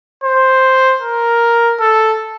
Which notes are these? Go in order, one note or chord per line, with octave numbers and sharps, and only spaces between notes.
C5
A#4
A4